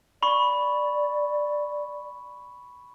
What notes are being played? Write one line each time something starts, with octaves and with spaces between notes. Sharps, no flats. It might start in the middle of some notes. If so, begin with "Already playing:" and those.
D5 B5 C#6